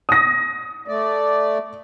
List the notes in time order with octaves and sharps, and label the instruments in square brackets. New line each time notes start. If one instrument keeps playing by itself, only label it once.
[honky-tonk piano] D#6 A#6
[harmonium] A3 D5